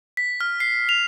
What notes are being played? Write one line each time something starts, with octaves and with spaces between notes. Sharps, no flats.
B6
F6
C7
F7